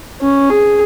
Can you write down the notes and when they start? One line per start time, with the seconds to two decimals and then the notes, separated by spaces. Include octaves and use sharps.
0.21 C#4
0.50 G#4